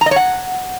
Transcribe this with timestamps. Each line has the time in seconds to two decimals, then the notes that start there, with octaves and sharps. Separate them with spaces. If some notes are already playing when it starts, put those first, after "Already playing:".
0.01 A#5
0.06 D#5
0.11 C#5
0.16 F#5